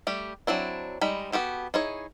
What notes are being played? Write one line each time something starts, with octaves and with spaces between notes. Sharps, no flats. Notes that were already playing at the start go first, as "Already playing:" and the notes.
G3 A3 G4
F#3 C4 D4 E4
G3 G#3 D#4 B5
B3 F#4 G4 A4
D#4 E4 G#4 C#5